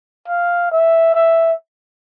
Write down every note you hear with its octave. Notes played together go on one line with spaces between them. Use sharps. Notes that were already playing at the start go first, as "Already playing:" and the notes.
F5
E5
E5